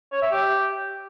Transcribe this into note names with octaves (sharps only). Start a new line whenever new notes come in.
C#5
E5
G4